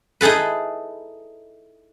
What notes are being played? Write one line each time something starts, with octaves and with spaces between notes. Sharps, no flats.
D#4 E4 G#4 A4 B4